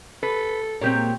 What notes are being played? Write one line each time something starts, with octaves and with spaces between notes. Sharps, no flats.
A4 B4
A#2 G#3 A#3 C4 G4 C#5